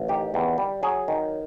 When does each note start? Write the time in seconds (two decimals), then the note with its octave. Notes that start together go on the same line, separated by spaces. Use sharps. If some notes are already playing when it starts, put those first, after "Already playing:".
Already playing: A1
0.08 D#3 G4
0.34 E2
0.58 G3
0.83 F#3 G#4
1.08 D#3